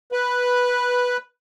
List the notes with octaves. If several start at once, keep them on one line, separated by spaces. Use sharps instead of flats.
B4